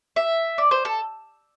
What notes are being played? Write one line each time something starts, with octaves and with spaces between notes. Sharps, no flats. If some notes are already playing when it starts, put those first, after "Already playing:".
E5
D5
C5
A4